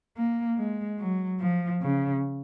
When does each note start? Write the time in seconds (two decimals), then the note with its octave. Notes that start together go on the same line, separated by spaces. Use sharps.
0.17 A#3
0.58 G#3
1.00 F#3
1.41 F3
1.82 C#3